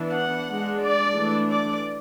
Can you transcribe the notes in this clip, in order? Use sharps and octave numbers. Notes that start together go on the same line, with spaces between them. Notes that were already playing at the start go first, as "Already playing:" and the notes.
Already playing: E3 B3 D4
F#5
G#3 D4
D5
E3 A3 D4
D5